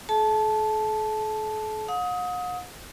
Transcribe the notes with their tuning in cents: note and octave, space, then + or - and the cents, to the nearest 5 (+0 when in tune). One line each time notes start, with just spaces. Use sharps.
A4 -45 A5 -10
F#5 -45 D#6 +25